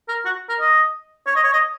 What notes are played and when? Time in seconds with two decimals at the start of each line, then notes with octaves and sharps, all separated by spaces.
0.08 A#4
0.25 F#4
0.49 A#4
0.60 D#5
1.27 C#5
1.36 D#5
1.43 C#5
1.53 D#5